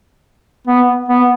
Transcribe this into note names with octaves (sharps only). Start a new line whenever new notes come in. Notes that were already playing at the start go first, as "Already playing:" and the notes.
B3
B3